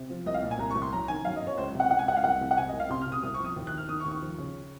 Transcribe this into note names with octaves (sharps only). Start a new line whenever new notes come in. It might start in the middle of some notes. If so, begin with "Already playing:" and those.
Already playing: C3
F3
C2 D#5
F5
A#2
G#5
C2 A#5
C#6
C2
C6
F#2 A#5
D#3 G#5
F#2 F5
D#5
F#2 C#5
C#2 C5
C3
F#5
C#2 F#5
G#5
C#2 F#5
F5
C2 F#5
C2
F#5
C3 G#5
D#5
C2
F5
C3 C6
F6
C3
D#6
C2 D#6
C#6
F3
D#6
D#2
F#6
D#3
F6
D#3 D#6
C#6
D#2
C#6
F3
C#3